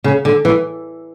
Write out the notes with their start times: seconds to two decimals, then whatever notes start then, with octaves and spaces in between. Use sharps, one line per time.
0.04 C#3
0.25 D3
0.45 E3